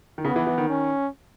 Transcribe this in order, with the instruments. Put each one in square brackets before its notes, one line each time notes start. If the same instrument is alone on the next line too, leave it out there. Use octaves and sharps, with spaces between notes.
[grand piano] D#3
[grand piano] C#3 [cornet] B3
[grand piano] E3
E3
D#3
[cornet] C#4